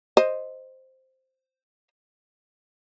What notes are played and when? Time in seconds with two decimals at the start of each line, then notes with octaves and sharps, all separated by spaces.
0.17 C5 D#5